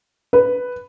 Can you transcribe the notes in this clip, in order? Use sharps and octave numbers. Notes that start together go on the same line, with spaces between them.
B4